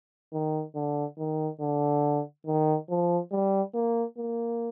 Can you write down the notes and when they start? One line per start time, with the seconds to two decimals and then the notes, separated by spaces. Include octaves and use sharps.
0.33 D#3
0.75 D3
1.18 D#3
1.61 D3
2.46 D#3
2.90 F3
3.32 G3
3.74 A#3
4.18 A#3